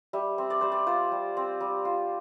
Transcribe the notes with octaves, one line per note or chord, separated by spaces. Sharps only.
G3 E5
C4
D5
G3 C5
D5
F4 C5
G3
C4
G3
F4